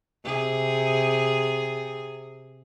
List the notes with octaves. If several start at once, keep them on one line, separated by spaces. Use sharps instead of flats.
C3 G#4